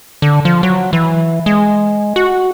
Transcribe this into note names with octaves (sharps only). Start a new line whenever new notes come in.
D3
F3
F#3
E3
G#3
F#4